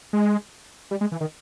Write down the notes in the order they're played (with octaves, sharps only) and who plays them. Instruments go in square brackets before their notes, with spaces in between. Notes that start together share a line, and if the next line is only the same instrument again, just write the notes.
[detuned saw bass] G#3
G3
G#3
E3
D#3